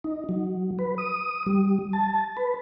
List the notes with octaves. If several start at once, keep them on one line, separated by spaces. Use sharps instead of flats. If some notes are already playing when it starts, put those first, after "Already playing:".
D#4
F#3
B4
D#6
G3
A5
B4